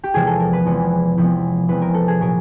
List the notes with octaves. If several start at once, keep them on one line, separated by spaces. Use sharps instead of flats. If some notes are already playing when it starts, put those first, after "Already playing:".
G4
E2 C3 F3 G#3 B3 G#4
A4
A#4
B4
E2 C3 F3 G#3 B3
E2 C3 F3 G#3 B3
E2 C3 F3 G#3 B3 B4
A#4
A4
G#4
A#2 F#3 B3 A#4